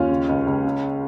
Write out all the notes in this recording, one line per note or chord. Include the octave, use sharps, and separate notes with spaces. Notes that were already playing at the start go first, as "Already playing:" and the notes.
Already playing: D#2 C#4 F4
C#3
C#2
C#2
C#3